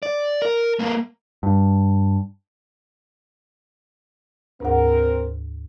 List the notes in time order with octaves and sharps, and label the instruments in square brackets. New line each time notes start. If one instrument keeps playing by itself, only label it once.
[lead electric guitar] D5
A#4
G#3 A#3
[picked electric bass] G2
[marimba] D2 G#2 F#5 [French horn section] C4 A#4